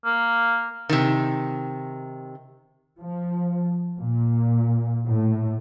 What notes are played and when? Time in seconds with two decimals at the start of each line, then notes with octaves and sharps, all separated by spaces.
0.05 A#3
0.89 C3 D#3
3.00 F3
3.98 A#2
5.06 A2